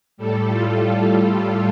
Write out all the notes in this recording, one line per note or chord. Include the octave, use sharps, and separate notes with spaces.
A2 G3 A4
F4